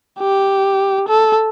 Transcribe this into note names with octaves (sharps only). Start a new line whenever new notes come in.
G4
A4